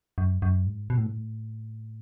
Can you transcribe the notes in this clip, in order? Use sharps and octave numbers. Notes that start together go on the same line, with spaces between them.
F#2
F#2
G#2
B2
A2
G#2
A2